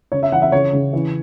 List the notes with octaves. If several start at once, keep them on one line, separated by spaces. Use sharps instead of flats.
C#3 C#5
E5
E3 F#5
E5
C#3 C#5
C#3
E3